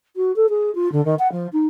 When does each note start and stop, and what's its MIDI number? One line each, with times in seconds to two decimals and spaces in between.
0.16 0.34 66
0.36 0.46 69
0.49 0.73 68
0.75 0.91 65
0.92 1.03 50
1.05 1.15 51
1.19 1.30 78
1.32 1.47 53
1.53 1.67 63